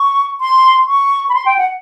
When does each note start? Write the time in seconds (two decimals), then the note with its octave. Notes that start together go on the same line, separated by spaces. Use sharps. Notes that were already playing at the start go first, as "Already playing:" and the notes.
Already playing: C#6
0.41 C6
0.87 C#6
1.29 B5
1.34 C6
1.46 G5
1.58 F#5